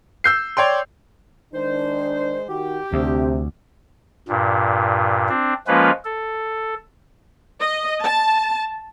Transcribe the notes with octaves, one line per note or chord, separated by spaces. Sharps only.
E6 G6 C7
C#5 D5 G5 C6
D#3 G#3 D4 C5
D#3 F#4 G4
D2 C3 A3 C4 D4
G2 A#2
C4 D4
F3 G#3 A#3 C#4 F4 B4
A4
D#5
A5